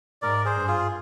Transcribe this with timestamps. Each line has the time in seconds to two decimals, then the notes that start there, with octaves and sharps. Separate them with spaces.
0.22 G#2 A#4 D5
0.45 G#4 C5
0.57 G2
0.68 F4 G#4